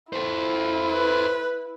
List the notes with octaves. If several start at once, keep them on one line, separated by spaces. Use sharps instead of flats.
E4 A4 C5
B4